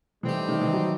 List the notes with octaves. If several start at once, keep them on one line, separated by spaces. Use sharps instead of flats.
A2 E3 G3 C4 D#4 G4
D#3
E3
F#3